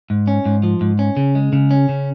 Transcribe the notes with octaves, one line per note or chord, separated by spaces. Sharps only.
G#2
C#4
G#2
F3
G#2
C#4
C#3
G#3
C#3
C#4
C#3